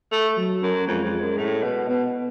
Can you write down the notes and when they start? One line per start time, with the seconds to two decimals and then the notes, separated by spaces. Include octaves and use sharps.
0.12 A3
0.37 F#3
0.63 F#2
0.87 F2 G#3
1.04 F2
1.22 F#2
1.37 A2
1.63 B2
1.88 B2 B3